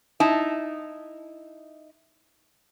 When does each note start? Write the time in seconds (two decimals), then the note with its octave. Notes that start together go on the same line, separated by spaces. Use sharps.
0.20 D#4 E4 A5